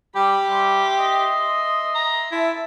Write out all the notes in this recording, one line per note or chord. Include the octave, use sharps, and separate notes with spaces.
G3 G4 B5
G3 E5 C6
D#5
A#5
E4 E5 A5